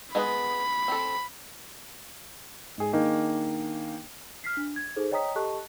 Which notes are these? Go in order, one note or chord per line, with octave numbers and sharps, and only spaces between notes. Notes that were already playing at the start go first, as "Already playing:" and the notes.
G#3 B3 B4 B5
C4 A4
G#2 G#4
D#3 A#3 D4 D#4 G#4
F6 B6 C7
D4
G#6
D#4 G#4 A4 C5
C#5 D#5 G5 A#5 D#6 B6
G4 A4 D#5 A5 C#6 F#6